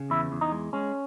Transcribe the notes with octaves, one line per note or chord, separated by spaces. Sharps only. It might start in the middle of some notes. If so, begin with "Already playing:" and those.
Already playing: C#3
E2 E4
E2
D#4
G#3
G#3 C#4